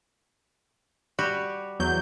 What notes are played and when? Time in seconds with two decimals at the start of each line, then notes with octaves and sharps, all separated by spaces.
1.19 G3 F#4 G4
1.80 E2 F#3 G6